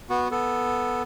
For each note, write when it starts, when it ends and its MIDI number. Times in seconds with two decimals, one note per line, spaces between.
0.10 0.28 59
0.10 0.28 66
0.31 1.03 59
0.31 1.03 69